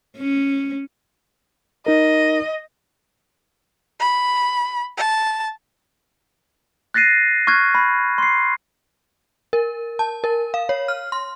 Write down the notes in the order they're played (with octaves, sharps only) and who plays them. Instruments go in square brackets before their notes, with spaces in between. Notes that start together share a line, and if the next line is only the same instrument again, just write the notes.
[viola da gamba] C#4
[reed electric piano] D#4 A#4 [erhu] D#5
[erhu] B5
A5
[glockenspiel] F#6 A6 A#6 C7 D#7
C#6 F6 F#6 G#6
B5
C6 C7
[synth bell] A#4
A5
A#4
F5
C#5
F6
C6